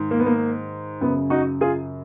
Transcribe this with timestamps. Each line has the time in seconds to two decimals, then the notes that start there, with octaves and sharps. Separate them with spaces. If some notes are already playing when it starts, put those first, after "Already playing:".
Already playing: G#2 D#3
0.11 A#3
0.20 B3
0.26 A#3
1.01 F#2 C#3 B3
1.30 D#4 F#4
1.61 F4 G#4